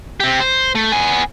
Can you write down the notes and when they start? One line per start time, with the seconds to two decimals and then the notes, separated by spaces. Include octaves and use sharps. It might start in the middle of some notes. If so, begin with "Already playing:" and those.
0.20 C4 G4
0.40 C5
0.75 A3
0.92 B3 G#5